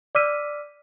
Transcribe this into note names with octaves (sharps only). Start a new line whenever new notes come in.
D5 D6 E6 F6 B6 D#7